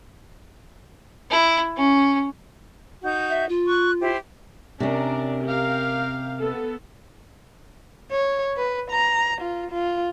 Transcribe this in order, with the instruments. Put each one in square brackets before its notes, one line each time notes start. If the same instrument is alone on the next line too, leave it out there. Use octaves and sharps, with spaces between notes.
[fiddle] E4
C#4
[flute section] D#4 F#4 G6
[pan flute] E5
F4
[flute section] C#6 F#6
E4 G4 C5
[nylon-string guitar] C3 C#4 [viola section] D4 A#4
[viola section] G4 A#4 F5
B3 A4
[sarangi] C#5
B4
A#5
F4
F4